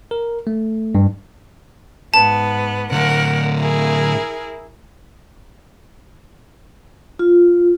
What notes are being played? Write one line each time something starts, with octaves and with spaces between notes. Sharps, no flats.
A#4
A3
G2
G#2 B3 A5
A2 D3 A#4 F#5
E4 G#4 A#4
F4